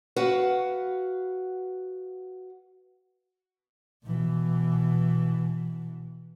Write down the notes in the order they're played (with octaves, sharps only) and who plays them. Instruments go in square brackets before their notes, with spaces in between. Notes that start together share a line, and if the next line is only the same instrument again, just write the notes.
[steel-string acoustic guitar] F#4 B4 F5 F#5
[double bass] B2 E3